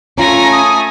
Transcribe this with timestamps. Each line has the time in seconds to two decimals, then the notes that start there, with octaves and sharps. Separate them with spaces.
0.18 A3 C#4 F4 G#5 A#5
0.52 D#6